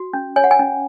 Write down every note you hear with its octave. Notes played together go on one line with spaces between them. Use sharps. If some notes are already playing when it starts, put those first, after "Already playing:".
Already playing: F#4
C#4
C#5 G#5
F#5
G#5
C#4